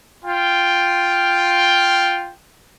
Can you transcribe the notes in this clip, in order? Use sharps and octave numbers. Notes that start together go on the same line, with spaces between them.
F4 G5